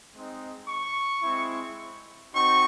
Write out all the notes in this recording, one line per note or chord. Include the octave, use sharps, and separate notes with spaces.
G#3 C4 D#4
C#6
G#3 C4 E4
C4 D#4 F#4 C#6